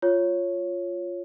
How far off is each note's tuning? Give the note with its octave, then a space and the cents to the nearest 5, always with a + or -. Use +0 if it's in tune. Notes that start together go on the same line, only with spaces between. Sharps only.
F4 +0 C#5 +0